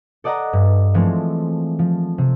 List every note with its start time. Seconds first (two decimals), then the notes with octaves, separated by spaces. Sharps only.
0.24 A4 D5 D#5 F#5 A#5
0.53 G2
0.94 E3 F3 G#3 A3 C4
1.79 F3
2.18 C3